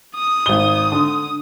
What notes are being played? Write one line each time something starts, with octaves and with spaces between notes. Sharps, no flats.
D#6
G#1 G7
D3